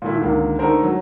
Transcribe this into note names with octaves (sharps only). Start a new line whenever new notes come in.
A#2 D#3 A3 E4
C#2 D3 D#3 A#3
D3 A3 D#4 A4 A#4 C5
F#3